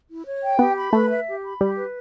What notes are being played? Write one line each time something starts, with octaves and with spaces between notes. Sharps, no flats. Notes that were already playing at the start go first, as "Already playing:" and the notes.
E4
C#5
G5
B3 G4
B5
A3 B4
E5
G4
B5
G3 G4
B4